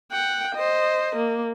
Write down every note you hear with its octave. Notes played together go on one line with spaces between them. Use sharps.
F#5 G5
C5 D#5
A#3